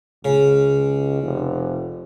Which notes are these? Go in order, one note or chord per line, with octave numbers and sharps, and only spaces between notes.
C#2 C#3
F1